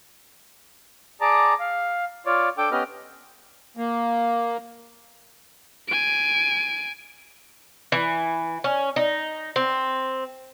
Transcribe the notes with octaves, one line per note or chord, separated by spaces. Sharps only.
G#4 D5 A5 A#5 D6
F5
F4 C#5 D5
D4 A4 G5 D6
B3 C#4 G4 B4 D#5 F6
A#3
G#5 D7
E3
C#4
D#4
C4